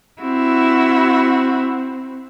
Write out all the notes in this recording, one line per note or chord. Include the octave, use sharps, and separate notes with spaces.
C4 E4 F#4